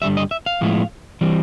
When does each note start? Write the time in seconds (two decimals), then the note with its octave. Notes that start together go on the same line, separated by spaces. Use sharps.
0.02 G2 D3 G3 E5
0.17 D#5
0.31 E5
0.46 F5
0.61 A2 F3 G#3 B3 E4
1.21 E3 G3 C4